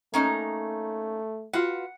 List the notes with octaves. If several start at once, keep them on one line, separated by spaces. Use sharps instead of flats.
A3 A#3 C#4 D#4
F4 F#4 B4 F#5